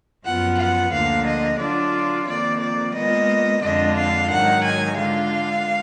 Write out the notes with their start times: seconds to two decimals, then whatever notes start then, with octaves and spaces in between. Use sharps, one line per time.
0.25 F#2 F3 B3 F4 F#5
0.59 F#5
0.92 D2 D3 F3 A#3 F5
1.26 D#5
1.59 D3 F#3 D4 F4 D5
2.27 F2 D#3 A#3 D5
2.61 D5
2.94 A#2 G#3 B3 D#5
3.61 F2 D3 G#3 D4 F4 D#5
3.96 F5
4.30 G#2 D#3 F#3 F#5
4.63 G#5
4.96 D3 G#3 D4 F4 F5